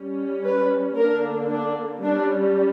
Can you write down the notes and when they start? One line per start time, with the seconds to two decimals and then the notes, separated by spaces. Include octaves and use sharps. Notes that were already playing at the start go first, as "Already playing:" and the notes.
Already playing: G3 C#4
0.45 B4
0.97 D3 A#3 D4 A#4
1.50 D4
2.04 G3 C#4 D4